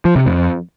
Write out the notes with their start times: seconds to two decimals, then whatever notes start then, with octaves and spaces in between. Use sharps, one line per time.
0.05 F3
0.16 C3
0.27 F2